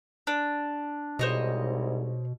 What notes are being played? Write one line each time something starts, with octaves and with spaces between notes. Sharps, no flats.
D4
C2 G#2 B2 C5 C#5 D#5